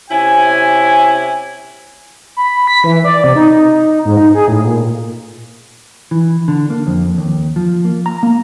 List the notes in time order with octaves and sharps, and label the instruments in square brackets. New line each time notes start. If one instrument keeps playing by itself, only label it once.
[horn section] C3 C#4 E4 G#5
[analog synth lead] B5
B6
E3
D5
C3
D#4
D#4
G#2
D#4
G#4
A2
A#2
[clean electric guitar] E3
D3
A#3
F2
D#2
F3
A#3
A#5
A#3